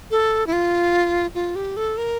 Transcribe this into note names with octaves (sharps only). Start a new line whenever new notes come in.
A4
E4
F4
F4
G4
A4
A#4